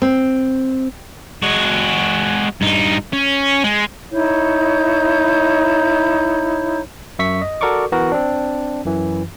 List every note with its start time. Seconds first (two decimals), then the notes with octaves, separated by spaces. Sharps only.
0.02 C4
1.43 G#3 F#4
2.61 G2 D#4
3.13 C#4
3.64 G#3
4.12 D#4 E4 C#5 G6
7.19 F#2 E5 C#6 B6
7.42 D#5
7.61 F#4 A4 A#4 D5 C#6 D6
7.92 E3 B3 F#4 A#4
8.12 C4 D4
8.85 F#2 E3